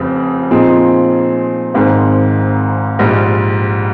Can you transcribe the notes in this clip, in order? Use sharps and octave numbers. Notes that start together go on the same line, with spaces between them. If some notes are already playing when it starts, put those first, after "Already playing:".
Already playing: F1 F2 C#3 C4
A#2 F3 C4 D#4 G#4
G#1 G#2 D#3 G#3 C4
A#1 G#2 G3